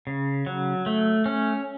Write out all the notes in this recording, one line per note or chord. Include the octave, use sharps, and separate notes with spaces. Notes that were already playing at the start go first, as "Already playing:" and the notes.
C#3
F#3
A3
C#4